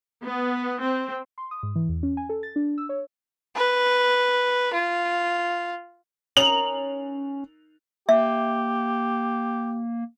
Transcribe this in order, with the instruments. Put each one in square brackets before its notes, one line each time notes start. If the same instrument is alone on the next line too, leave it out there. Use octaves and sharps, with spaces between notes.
[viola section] B3
C4
[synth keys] C6
D#6
G#2
E3
E2
C#4
G#5
A4
A6
D4
E6
C#5
[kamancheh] B4
F4
[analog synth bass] C#4 [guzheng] D#4 A#4 [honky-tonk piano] F7 F#7
[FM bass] A#3 [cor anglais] G4 [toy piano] E5